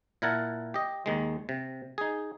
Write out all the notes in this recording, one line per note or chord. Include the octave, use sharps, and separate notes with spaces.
A#2 E4 A#4 F#5 A5
G4 D#5
D#2 D#3 G#3
C3
D#4 G#4